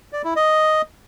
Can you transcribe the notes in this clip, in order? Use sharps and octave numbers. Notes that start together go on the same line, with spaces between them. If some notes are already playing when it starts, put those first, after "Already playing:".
D5
E4
D#5